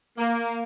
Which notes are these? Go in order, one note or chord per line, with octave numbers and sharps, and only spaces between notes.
A#3